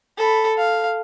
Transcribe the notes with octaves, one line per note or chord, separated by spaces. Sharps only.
A4 B5
F5